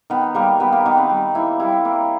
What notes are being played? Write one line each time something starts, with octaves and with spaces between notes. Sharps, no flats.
D#3 B3
G3 A#3
G3 B3
A#3
D#3 B3
C4
G3
A#3 E4
G3 E4
A#3